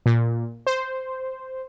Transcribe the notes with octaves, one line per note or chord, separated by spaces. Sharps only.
A#2
C5